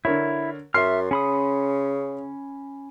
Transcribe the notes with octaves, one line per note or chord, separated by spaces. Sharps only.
D3 E4 A#4 C#5
F#2 E5 C6 F6 C7
C#3 C#4 B5 D#6